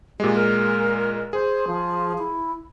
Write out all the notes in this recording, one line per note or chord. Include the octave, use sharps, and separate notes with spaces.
A#2 G#3 G4
A#4
G#4 C5
F3
E4